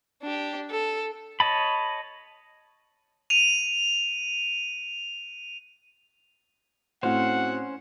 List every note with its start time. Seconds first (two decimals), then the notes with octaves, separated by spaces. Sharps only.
0.22 D4 G4
0.70 A4
1.40 C#5 D#5 A5 B5
3.30 D#7 F7
7.03 A2 C4 C#4 F#4 C5 F5 F#5